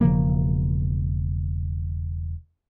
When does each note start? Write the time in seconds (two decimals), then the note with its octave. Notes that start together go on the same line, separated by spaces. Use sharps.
0.01 E1 C#3 F3 A#3